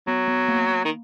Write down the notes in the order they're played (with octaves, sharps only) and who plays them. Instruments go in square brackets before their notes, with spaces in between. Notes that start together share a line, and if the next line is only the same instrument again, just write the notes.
[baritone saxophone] F#3 [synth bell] B3
[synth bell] B3
A#3
[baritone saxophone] D#3